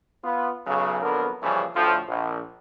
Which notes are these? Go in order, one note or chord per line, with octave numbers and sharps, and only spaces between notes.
B3 F4
B1 C#3 F#3
F2 D3 F#3 B3 A#4
A#2 C#3 E3 F3 G3 C#4
D2 A2 F3
A#1